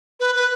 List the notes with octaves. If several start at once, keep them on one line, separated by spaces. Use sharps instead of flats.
B4
B4